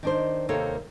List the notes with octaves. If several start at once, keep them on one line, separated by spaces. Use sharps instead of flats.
D#3 D4 C5
D#2 C3 A#3 A4 C5 C#5